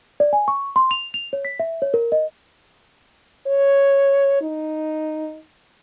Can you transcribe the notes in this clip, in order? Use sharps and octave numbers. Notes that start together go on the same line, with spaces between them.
D5
G#5
C#6
C6
F7
F7
C#5
B6
E5
C#5
A#4
D#5
C#5
D#4